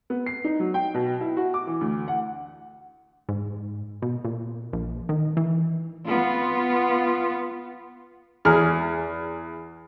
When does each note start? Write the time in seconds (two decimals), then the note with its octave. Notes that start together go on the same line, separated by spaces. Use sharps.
0.10 B3
0.26 C7
0.44 D#4
0.60 F#3
0.74 G5
0.94 B2
1.21 E4
1.37 F#4
1.54 D6
1.67 E3
1.81 D2
2.08 F#5
3.29 G#2
4.02 B2
4.25 A#2
4.73 A#1
5.09 D#3
5.37 E3
6.07 B3 F4
8.45 E2 G#4 F6